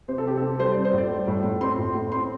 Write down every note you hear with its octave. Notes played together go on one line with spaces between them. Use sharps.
C3 C5
A4
C3 G4
C4 A4
G3 C5
D5
C4
C5
A2 D5
G3
A2
A2
C4 C6
A2
A2
C4 C6